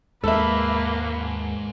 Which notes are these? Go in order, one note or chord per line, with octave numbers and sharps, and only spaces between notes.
D#2 G#2 G#3 A#3 A4 B4 E5 B5